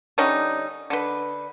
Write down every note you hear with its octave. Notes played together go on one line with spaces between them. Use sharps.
D3 G3 C#4 D#4
D3 B4